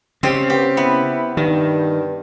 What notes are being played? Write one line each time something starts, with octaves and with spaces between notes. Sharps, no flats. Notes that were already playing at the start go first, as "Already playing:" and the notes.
C#3 G#3 C4 G4
B3 G4
B3 E4
G2 D#3